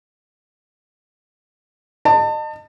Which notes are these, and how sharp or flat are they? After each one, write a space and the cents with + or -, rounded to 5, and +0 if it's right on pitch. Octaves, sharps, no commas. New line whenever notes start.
D#5 -30 A5 +30